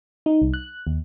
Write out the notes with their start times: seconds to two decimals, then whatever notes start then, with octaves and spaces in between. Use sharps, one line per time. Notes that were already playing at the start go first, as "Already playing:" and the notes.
0.26 D#4
0.42 C2
0.54 F#6
0.87 D#2